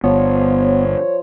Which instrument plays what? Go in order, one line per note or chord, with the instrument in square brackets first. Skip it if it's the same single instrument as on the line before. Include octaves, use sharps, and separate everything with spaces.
[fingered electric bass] G1 [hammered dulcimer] F3 D5 B5 [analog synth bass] B3 [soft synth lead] C#5